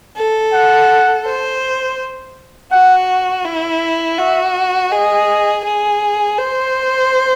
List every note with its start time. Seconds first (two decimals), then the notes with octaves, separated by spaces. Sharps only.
0.16 A4
0.53 F#5
1.26 C5
2.72 F#4 F#5
3.45 E4
4.18 F#4 E5
4.92 G#4 D#5
5.65 G#4
6.38 C5